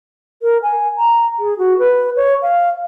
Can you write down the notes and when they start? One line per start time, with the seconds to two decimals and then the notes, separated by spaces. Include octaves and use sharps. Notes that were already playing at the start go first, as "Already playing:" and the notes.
0.42 A#4
0.63 G#5
0.98 A#5
1.40 G#4
1.59 F#4
1.79 B4
2.16 C#5
2.42 F5